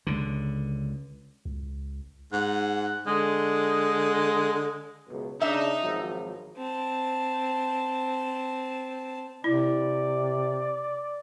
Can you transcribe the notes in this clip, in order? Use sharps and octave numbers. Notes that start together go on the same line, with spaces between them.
C#2 D3
C#2
G#2 F#5
D3 G#3
C#2 F#2 B2
C#3 D4 D#4 E5
G#1 F3 F#3
C4 A5
C3 E4 D5